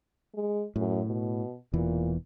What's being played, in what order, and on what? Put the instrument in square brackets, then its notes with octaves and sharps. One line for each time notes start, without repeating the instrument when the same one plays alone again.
[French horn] G#3
[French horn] F#2 [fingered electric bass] A2
[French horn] B2
[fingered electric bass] E1 E2 E3 [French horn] A#2